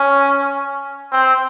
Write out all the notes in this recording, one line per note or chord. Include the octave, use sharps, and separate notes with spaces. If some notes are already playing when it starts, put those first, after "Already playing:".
Already playing: C#4
C4